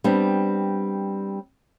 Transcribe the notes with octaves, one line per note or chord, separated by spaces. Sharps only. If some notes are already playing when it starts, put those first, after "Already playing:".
G3 B3 C4 D4